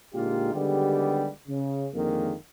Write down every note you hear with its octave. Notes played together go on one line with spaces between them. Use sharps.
A#2 D3 G#3 D#4 F4 G4
D3 D#3 G3 G#3 B3 G4
C#3
F2 D3 D#3 G#3 A#3